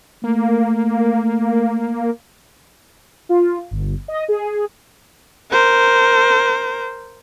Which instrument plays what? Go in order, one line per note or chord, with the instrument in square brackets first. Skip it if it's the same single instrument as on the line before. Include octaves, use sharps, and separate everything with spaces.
[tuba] A3 [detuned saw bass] A#3
[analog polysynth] F4
G1
D#5
G#4
[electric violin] A#4 C5